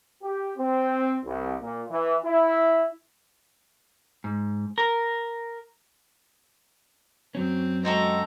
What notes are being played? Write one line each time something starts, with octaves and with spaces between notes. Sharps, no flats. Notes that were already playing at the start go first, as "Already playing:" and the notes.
G4
C4
C2
A#2
E3
E4
G#2
A#4
F#2 F#3 C4 C#4
G#3 C4 F#4 A4 A#5